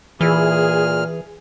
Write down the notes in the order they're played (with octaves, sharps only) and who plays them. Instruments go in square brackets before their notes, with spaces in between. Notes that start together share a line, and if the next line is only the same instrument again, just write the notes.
[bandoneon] A#2 F6 [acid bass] E3 [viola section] G#4